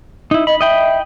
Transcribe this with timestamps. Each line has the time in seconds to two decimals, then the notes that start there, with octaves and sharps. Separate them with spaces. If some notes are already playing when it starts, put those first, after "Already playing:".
0.31 D#4 E4
0.47 D#5 B5
0.61 D#5 E5 G5 B5